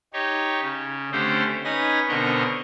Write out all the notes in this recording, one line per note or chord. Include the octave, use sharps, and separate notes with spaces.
D#4 G4 C#5
C#3
D3 A3 C4 C#4 G4 C5
C#4 D#4 B4 G#5 A#6
B2 D3 C4 A#4 D#5 C#6